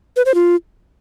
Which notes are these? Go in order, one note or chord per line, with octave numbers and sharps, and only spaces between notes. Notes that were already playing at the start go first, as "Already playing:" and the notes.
B4
C5
F4